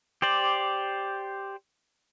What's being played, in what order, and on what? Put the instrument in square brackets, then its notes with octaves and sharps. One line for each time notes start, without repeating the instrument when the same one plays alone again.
[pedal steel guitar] G4 C5 D5